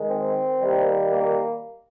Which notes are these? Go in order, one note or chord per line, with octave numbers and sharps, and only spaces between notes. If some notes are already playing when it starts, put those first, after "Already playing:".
Already playing: D#3 G#3
C4
D#3 G3 A#3
A#3